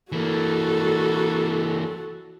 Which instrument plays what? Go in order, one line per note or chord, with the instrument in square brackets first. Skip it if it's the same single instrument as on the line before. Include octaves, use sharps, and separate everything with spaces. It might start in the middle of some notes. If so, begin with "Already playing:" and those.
[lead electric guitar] E3 A#3 [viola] F#4 A4